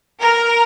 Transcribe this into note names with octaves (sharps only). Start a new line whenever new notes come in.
A#4